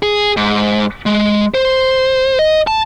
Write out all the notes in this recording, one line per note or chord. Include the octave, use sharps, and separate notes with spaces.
G#4
G#2
G#3
C5
D#5
A5